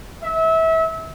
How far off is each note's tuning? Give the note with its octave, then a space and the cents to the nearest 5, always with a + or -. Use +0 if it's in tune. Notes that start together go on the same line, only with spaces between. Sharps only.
E5 -30